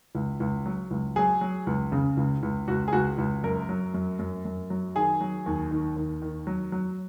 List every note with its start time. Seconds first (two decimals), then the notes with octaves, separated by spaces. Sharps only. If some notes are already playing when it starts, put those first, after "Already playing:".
0.15 C#2
0.40 C#2
0.66 F#3
0.91 C#2
1.16 F#3 G#4
1.41 F#3
1.67 C#2
1.92 C#3
2.17 C#2
2.43 C#2
2.68 C#2 F#4
2.88 G#4
2.93 C#2 F#4
3.18 C#2
3.44 F#2 A#4
3.69 F#3
3.94 F#2
4.19 F#2
4.45 F#2
4.70 F#3
4.95 D#3 G#4
5.21 F#3
5.46 D#2
5.71 D#3
5.97 D#2
6.22 D#3
6.47 F#3
6.72 F#3